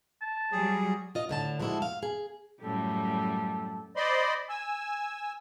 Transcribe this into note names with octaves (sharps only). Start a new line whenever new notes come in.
A5
F#3 G3 G#4
F4 D#5
A2 D3 A5
F3 G#3 D4 E4 F#4 A4
F5
G#4
F#2 A2 G3 A4
C5 D5 D#5 B5 C6
G#5 E6